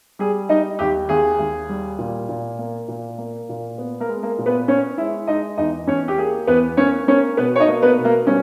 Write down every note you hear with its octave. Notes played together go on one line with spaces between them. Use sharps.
G3 G#4
G3 D#4 D#5
D#2 G4
D#2 G#4
D#2
G3
A#2
A#2
A#3
A#2
A#3
A#2
B3
A#3 A#4
G#3
A#3 A#4
A#2
B3 B4
B3 C#4 C#5
G#3 E4 E5
G#3 D#4 D#5
E2 D#4 D#5
E2 C#4 C#5
G4
A#3 G#4
E2 B3 B4
A#3 C#4 C#5
A#3 C#4 C#5
B2 B3 B4
C#5
D#4 D#5
A#3
B3 B4
B2
A#3 A#4
G3 C#4